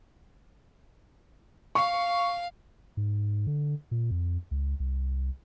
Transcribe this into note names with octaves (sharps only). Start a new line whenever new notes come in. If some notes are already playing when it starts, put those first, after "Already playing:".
F5 C#6
G#2
D3
A#2
F2
C#2
C2